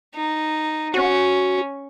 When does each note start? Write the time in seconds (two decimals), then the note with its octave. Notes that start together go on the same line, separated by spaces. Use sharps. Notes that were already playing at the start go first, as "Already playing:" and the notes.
0.15 D#4
0.94 C#4 F#4